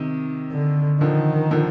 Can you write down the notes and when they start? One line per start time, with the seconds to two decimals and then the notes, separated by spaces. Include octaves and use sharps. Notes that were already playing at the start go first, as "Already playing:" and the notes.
Already playing: C3 D#3
0.51 D3
1.01 D3 D#3 F3
1.51 D3 F3